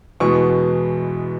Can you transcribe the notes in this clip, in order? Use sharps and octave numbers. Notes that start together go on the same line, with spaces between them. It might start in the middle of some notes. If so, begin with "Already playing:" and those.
E2 B2 G#3 B3 C#6